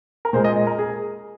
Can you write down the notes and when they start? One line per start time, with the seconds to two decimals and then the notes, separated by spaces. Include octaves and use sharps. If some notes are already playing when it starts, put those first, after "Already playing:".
0.25 A#4
0.33 A#2 G#3 C5
0.44 D#5
0.56 D#5
0.67 A#4
0.79 G#4